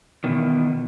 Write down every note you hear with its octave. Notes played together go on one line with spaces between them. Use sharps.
E2 B2 D#3